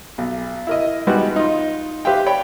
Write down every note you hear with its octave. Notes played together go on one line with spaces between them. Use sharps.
B1
E4 A#4 D#5
G3 G#3 B3 D#4 F#4
D#4 F4
G4 B4 C5 E5 F5 G5
C#5 D5 G5 B5